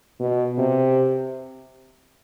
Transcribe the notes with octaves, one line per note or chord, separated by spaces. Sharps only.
B2
C3